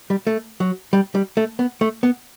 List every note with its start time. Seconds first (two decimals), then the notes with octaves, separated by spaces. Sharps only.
0.10 G3
0.27 A3
0.60 F#3
0.93 G3
1.15 G3
1.37 A3
1.59 B3
1.81 A3
2.03 B3